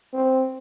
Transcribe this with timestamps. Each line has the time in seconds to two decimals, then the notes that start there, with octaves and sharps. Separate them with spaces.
0.14 C4